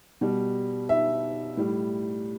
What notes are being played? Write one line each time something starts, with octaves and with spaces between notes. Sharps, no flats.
B2 G3
E5
A2 G3